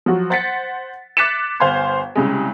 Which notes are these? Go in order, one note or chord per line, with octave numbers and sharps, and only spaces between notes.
F3 F#3 F#4
C5 F#5 A6 B6 C#7
D6 F#6 A6 B6 C#7 E7
G1 C5 F5 G#5 C6 G#6
C2 C#3 G#3